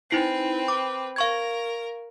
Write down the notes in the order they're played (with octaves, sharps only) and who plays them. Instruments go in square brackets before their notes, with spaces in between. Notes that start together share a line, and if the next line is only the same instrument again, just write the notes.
[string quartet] C4 B4 [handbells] D#4 E4 C7
[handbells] D6
[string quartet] A#4 [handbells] F5 C#6 G#6